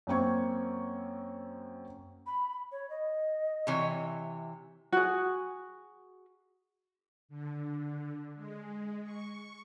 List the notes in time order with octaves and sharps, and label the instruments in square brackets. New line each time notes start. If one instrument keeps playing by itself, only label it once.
[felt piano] F#2 A#3 C4 C#6 G#6
[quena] B5
C#5
D#5
[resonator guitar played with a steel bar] C3 E3 C#5
[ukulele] F#4 G#4
[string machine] D3
G#3
C#6